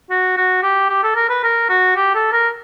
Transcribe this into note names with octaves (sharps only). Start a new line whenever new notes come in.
F#4
F#4
G4
G4
A4
A#4
B4
A#4
F#4
G4
A4
A#4